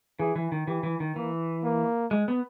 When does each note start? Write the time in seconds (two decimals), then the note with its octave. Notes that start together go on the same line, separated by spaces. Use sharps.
0.20 E3 G#4
0.36 E3
0.52 D#3
0.67 E3 G4
0.83 E3
1.00 D#3
1.16 E3 A#3
1.64 A#3
2.11 G#3
2.28 B3